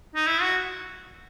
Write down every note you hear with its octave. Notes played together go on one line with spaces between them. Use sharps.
D#4
E4
F#4